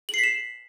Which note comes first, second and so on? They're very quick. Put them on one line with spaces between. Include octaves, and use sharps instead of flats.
F#7 C7 B6 E7